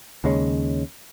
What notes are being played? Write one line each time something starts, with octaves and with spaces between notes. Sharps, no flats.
D#2 C#3 G#3 C#4